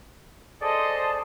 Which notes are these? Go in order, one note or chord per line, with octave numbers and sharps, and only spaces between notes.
G#4 A4 C5 D5 D#5 A5